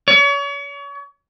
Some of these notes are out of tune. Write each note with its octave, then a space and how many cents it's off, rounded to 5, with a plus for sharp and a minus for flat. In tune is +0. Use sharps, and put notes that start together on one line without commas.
C#5 +35